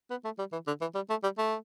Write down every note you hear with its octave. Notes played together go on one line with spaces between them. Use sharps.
B3
A3
G3
E3
D3
E3
G3
A3
G3
A3